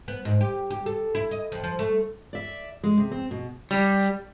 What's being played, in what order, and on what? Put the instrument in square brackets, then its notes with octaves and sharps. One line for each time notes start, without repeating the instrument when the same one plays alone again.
[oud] B3
G#2
G4
G4
A4
E4
D#5
F2
F3
A3
[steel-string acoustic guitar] D5 E5
G#3
C3
C4
B2
[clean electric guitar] G3